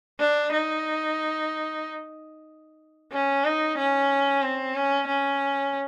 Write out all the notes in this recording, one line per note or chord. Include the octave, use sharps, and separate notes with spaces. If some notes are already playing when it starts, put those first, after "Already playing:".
D4
D#4
C#4
D#4
C#4
C4
C#4
C#4